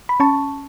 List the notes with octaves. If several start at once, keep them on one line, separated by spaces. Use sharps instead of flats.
B5
C#4 A5 C#6